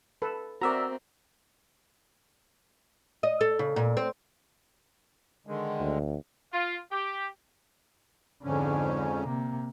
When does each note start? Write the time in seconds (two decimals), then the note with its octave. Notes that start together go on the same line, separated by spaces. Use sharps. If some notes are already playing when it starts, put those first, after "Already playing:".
0.22 A4 B4
0.61 C4 F#4 A#4 D5 E5 A#5
3.23 D#5
3.41 A4
3.59 C#3
3.76 A#2
3.97 C4
5.47 D3 D#3 G#3
5.79 D2
6.53 F4
6.92 G4
8.44 F2 G#2 D3 C#4
9.22 C3 A#3